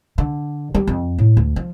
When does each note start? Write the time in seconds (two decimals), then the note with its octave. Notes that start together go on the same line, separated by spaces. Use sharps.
0.18 D3
0.75 G3
0.87 F2
1.19 A2
1.37 D2
1.56 F3